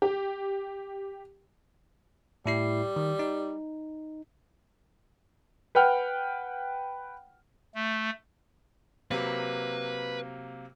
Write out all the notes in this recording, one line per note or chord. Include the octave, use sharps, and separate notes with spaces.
G4
A2 G3 E4 C7
D#3
D#4
B4 F#5 G5 F6
A3
C3 F#3 A#3 B4